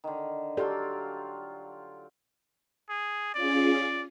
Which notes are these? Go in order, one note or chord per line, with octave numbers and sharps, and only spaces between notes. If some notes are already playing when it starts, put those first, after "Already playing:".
D3 D#3
F#3 F4 G4 A4 D5 G5
G#4
C#4 F4 G#4 D5